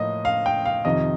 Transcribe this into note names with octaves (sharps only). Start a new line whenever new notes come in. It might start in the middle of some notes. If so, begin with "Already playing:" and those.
Already playing: A2 F3 A#3 D#5
F5
G5
F5
F2 C3 D#3 D#5